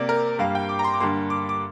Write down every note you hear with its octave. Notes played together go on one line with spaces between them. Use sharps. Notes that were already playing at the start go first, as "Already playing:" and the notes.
Already playing: C3 A#3 D5
A#4
G2 G3 A#3 F5
G5
D6
A#5
C6
D6
G2 D3 G3 A#3 C6
D6
D6